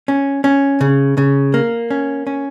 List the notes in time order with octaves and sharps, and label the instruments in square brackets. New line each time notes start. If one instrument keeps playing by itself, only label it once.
[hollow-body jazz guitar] C#4
C#4
C#3
C#3
A#3
C#4
C#4